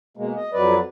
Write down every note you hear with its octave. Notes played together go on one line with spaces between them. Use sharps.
B2 G#3 A#3
D#5
F2 F#3 B4 D5